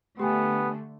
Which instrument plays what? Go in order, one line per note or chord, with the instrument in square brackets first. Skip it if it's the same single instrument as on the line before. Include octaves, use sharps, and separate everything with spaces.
[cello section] D3 A3 [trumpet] B3 [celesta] G4 G5 G#5